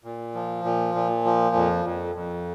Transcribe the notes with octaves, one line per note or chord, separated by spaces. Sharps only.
A#2
F3
A#2
A#2
F3
F2
F2
F2